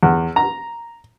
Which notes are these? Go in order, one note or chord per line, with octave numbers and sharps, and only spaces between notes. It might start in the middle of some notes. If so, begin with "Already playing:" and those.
E2
A#5